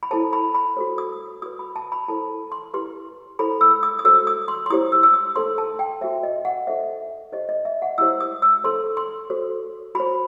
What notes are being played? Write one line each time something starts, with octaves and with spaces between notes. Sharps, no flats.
B5
E4 A4 C5 A5
B5
B5
F#4 A4 C5
D#6
F#4 B4 D#6
B5
A5
B5
E4 A4 C5 A5
C6
E4 G4 B4 C6
E4 A4 C5 B5
E6
D#6
D#6
F#4 A4 C5 E6
D#6
C6
C6
E4 G4 C5 D#6
E6
E6
D#6
D#4 A4 C5 C6
A5
G5
F#4 C5 E5
D#5
F#5
D#4 A4 C5 E5
D#4 G4 C5 D#5
D#5
E5
F#5
E4 G4 C5 E6
D#6
E6
D#4 A4 C5 C6
C6
F#4 A4 C5
F#4 C5 B5